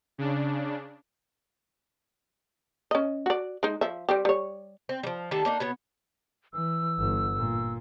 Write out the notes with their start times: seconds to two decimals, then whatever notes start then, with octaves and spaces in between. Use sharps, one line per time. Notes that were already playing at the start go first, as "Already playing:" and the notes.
0.18 C#3 D4
2.91 C#4 D#5
3.26 F#4 D5
3.63 G#3 D#4
3.81 F3 E5
4.09 G3 C4 G4
4.25 G3 C#5
4.89 C4
5.03 F3 G3
5.31 D#3 G3 A3 A4
5.45 A#3 D4 D#4
5.60 B2 B3 C#5
6.53 E3 E6
6.99 G1
7.36 A#2